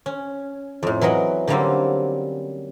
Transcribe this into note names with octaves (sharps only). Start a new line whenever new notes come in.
C#4
F2 A2
E3 F#3 A#4 D#5 F#5
D3 F#3 G3 A#3 C4 C#4